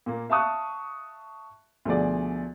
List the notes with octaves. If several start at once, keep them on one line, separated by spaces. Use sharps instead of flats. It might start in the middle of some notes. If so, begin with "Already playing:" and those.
A#2 A#3
E5 F5 A5 C#6 D#6 F#6
D2 B2 F3 G#4 D5